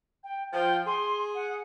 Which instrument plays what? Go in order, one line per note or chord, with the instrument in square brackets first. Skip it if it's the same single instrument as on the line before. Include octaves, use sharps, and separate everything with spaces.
[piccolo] G5
[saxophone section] F3 [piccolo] G5
[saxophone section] G#4 [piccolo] C6
[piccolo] F#5